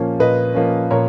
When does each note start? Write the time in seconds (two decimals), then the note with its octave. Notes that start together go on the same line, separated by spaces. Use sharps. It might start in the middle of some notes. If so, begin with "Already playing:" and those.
Already playing: A#2 F3 A#3 C#4
0.19 A#2 B4 D#5
0.55 F3 A#3 C#4
0.91 A#2 A#4 C#5